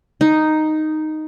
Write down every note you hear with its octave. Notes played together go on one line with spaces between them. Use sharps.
D#4